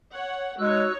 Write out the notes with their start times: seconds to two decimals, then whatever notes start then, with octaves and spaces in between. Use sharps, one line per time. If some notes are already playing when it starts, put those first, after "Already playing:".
0.12 C#5 F#5
0.59 G#3 D#4 F#4 C#5 E6 F#6